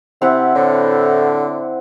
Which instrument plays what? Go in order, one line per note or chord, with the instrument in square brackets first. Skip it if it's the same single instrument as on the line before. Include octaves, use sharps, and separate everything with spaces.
[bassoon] C3 [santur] C4 E4 F#5
[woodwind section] A2 [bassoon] D3